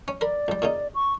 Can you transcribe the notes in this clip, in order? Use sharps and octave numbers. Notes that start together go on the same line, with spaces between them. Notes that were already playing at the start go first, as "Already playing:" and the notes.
C#4
A#4 D5 B5
C#2 G3
A#2 C#3 D#4
C#6